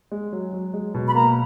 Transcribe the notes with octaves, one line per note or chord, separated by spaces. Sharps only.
G#3
F#3
F#3
G#3
B2
B5
A#3 A#5